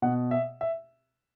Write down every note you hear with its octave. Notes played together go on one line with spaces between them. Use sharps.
B2 F#5
E5
E5